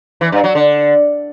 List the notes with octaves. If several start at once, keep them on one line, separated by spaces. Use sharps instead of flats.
E3
G2
F#3
D3